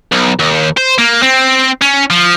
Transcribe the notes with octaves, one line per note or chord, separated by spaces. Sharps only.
B1
D#2
C5
A#3
C4
C#4
F3